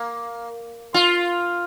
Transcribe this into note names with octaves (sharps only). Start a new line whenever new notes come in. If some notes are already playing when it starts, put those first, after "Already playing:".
Already playing: A#3
F4